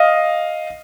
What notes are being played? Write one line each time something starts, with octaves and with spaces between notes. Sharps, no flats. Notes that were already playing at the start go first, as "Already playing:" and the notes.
Already playing: D#5 F5